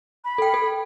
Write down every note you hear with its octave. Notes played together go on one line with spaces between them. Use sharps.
B5
A4 G5
A4